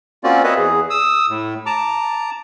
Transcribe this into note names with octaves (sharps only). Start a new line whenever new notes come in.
A#3 C4 C#4 F4 F#4 D5
C4 B4 C#5 D#5 E5
E2 G#4
D#6 E6
A2
A5 A#5 D6